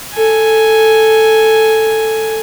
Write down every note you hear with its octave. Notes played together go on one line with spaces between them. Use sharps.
A4 G#5